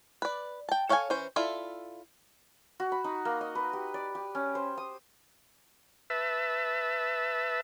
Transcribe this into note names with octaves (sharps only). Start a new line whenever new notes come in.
B4 D5
G5 A5
A4 C#5 F5 F#5 G#5
E3 C#4 C5
E4 F4 A4 D5 E5
F#4
B5
D#4
A#3
D#5
B4
G4
D5
G4
C#4
C5
D#6
B4 E5 A5